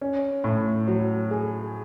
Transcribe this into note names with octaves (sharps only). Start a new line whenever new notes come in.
C#4
A2
F#3
G#4